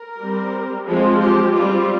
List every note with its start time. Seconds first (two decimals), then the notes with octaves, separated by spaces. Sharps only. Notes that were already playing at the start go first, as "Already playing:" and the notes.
Already playing: A#4
0.19 G3 C4
0.87 F3 G#3 C4 G#4
1.21 G4
1.55 G3 C4 F4